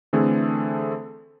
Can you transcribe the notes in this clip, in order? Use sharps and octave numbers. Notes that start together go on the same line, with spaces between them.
D3 E3 A3 C4 G#4 A4